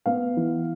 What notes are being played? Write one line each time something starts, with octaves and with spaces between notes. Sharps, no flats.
B3 F5
E3